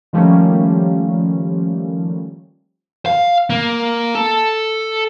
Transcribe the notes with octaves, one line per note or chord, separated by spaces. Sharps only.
D#3 F3 G3 A3 A#3 C#4
F5
A#3
A4